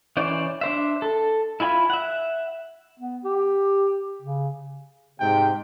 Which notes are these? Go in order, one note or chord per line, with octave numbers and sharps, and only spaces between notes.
E3 C#4 C5 D5
D4 C5 E5
A4
E4 F4 G#5 B5
E5 F#5
B3
G4
C#3
G#2 C3 G5